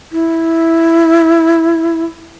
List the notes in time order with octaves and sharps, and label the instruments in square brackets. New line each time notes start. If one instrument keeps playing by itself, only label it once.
[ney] E4